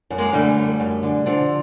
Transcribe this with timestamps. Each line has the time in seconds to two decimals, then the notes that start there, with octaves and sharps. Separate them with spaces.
0.10 F#2
0.18 G#3 A#3
0.33 D3 G3 A3
0.57 F#2
0.80 F#2
1.03 D3
1.26 D3 F3